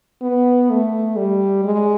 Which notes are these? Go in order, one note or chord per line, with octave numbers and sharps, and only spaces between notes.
B3
A3
G3
G#3